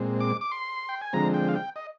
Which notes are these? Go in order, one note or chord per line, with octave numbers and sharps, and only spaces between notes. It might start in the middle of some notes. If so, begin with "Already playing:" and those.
Already playing: A#2 G#3 C4
D6
D6
C6
G5
G#5
D3 F3 G#3 C4 A#5
G5
F5
G5
D#5